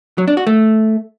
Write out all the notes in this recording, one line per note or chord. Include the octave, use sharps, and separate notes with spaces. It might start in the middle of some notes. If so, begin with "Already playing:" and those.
F#3
D4
F#4
A3